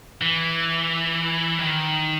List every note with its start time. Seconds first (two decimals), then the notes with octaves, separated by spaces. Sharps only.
0.22 E3
1.60 D#3